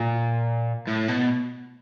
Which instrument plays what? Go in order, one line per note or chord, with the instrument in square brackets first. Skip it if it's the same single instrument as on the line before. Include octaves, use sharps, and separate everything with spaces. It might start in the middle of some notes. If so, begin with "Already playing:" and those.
Already playing: [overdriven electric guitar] A#2
A2
B2